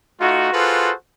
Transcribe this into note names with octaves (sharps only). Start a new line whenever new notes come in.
A3 D#4 F4 F#4
F4 F#4 G#4 A4 B4 C5